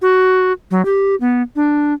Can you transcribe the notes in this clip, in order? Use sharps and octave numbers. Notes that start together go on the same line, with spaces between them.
F#4
F#3
G4
B3
D4